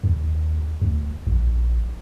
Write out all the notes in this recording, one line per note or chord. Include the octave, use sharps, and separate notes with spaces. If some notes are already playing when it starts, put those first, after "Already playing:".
D#2
D2
A#1